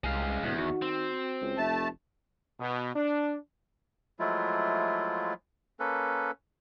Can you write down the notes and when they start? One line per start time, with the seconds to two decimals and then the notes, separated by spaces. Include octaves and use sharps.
0.04 C2 G#3 F5
0.43 D1 E2 B2
0.58 D#3 F#4
0.82 C4
1.41 C#2
1.58 F1 A3 A5
2.60 B2
2.95 D4
4.19 F3 F#3 G#3 A3 E4 F4
5.80 A#3 C#4 A4 B4